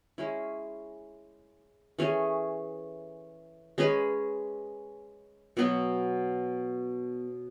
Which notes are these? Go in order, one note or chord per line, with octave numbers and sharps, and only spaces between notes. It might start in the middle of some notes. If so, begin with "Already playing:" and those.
G#3 C#4 E4
E3 A3 C#4 G#4
G#3 C#4 G#4 B4
B2 F#3 B3